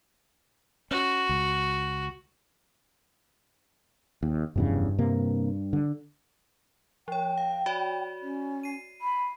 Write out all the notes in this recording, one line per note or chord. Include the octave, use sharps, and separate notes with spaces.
C#4 F#4
C#2
D#2
F1 E2 G2 C#3
C3 A#3
D3
F3 C#5 G5
F5
F#4 C#5 D5
C#4
C7 D#7
B5